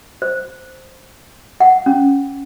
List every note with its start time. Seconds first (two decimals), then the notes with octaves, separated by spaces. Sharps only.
0.22 C5
1.60 F#5
1.86 C#4